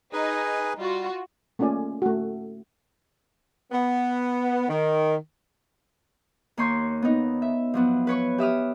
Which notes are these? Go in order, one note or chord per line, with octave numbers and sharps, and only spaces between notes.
D#4 G#4 B4 G#5
G3 F4 F#4
A3 A#3 C#4 F4 D5 G#5
A3 F#4
B3
D#3
D#2 A#3 C#5 C6 C#6 G6
B3 D#4
E5
F3 F#3 B3
B4 C#5 C#6
G4 E5 D#6 F6